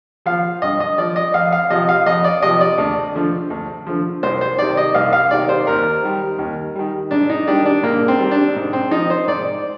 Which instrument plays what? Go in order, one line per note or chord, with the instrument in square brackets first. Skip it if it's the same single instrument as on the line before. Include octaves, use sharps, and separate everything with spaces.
[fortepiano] F3 F5
G2 D#5
D#5
F3 D5
D#5
F2 F5
F5
C3 F3 D#5
F5
F2 D#5
D5
C3 F3 D#5
D5
D2
D3 F3
D2
D3 F3
C2 C5
C5
C3 D#3 D5
D#5
C2 F5
F5
C3 D#3 D5
C5
D#2 A#4
D#3 G3
D#2
D#3 G3
G#2 D4
D#4
D#3 G3 D4
D4
G#2 A#3
C4
D#3 G3
D4
G#2
C4
F3 D#4
C5
G#2 D5